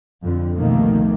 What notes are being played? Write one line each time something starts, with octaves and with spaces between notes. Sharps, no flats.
F2 D3
C2 B2 D#3 F3 A3 A#3